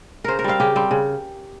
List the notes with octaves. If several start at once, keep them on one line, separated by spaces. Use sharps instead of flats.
C#3 A#4 C5
A#4
G3 C4 F5
C#3 G4
G3 C4
C#3